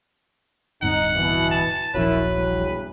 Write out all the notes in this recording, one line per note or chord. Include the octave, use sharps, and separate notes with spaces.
D1 G2 C4 D#4 F#5
B2 E3
A5
D#1 A#1 F#2 F#3 E4 B4
E2 G2